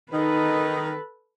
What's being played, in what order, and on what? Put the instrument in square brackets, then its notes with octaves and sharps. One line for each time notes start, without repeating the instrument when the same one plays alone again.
[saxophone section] D#3 D#4 [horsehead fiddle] A4 B4